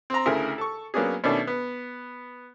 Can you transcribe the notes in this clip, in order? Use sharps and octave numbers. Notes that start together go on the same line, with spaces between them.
C4 A#5
D2 C#3 A3 E4 G#4 A#4
A4 C#6
F#3 A#3 B3 C#4 D4 G#4
B2 D#3 A3 C#4 D4
B3